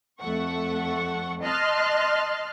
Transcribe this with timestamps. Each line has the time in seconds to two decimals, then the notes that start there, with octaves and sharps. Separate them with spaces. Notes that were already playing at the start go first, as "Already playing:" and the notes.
0.20 F2 A3 A4 F#5 C#6
1.42 D#5 A5 C6 F6 F#6 A6